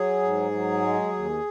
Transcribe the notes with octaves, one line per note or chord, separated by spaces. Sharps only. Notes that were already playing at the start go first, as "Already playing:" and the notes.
Already playing: F#3 G#4
G#2
F#3
G#3
D#2